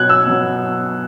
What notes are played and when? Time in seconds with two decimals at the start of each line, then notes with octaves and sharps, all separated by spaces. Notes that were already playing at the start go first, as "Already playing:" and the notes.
Already playing: B2 F#3 B3 F#6 G#6
0.09 E6
0.27 B2 F#3 B3